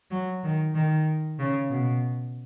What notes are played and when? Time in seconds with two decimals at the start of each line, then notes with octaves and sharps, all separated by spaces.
0.11 F#3
0.43 D#3
0.74 D#3
1.39 C#3
1.70 B2